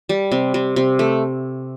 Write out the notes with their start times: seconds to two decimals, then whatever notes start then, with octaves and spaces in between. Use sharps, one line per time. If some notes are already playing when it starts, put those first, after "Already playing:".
0.09 G3
0.32 C3
0.54 C3
0.76 C3
0.99 A3